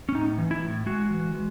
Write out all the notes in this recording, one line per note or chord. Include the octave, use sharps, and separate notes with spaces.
C#4
A2 D#4
E3
E4
A2
G#3 F#4
E3
G#3